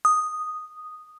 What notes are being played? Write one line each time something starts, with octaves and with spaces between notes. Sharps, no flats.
D#6